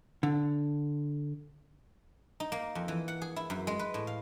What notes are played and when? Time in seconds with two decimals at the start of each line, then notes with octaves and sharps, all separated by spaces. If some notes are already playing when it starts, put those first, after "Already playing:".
0.23 D3
2.40 D#4
2.52 A#3
2.75 F2
2.88 E3
3.08 F#5
3.22 G#4
3.36 E4
3.50 F#2
3.67 G#3
3.79 B4
3.94 A2
4.07 F5